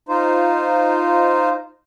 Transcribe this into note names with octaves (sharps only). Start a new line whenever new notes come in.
D#4 F4 C5